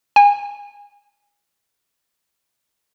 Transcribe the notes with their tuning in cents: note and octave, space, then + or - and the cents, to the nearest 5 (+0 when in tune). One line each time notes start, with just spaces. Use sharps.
G#5 -30